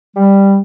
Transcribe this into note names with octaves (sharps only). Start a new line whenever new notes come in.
G3